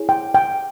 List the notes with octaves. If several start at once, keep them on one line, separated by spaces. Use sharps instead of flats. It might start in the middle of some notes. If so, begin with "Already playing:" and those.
Already playing: E4 G#4 C#5
G5
G5